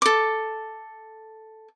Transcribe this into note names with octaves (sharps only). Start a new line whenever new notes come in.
A4 D6